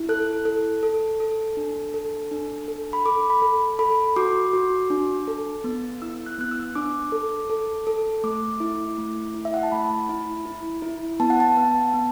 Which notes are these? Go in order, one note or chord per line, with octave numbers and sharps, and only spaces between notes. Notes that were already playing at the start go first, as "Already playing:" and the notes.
Already playing: E4
A4 F#6
A4
A4
A4
D4
A4
D4
A4
B5
A4 D6
B5
A4
A4 B5
F#4 D6
F#4
D4
A4
B3
E4 E6
F#6
B3 F#6
E6
D4 D6
A4
A4
A4
A3 D6
E4
A3
E4
E5
F#5
A5
A3 B5
E4
E4
E4
B3 A5
F#5
A5
B3
B3